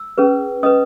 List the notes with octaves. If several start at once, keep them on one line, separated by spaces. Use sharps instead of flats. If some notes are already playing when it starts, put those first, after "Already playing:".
Already playing: E6
C#4 G#4 B4
C#4 G#4 B4 D#5 D#6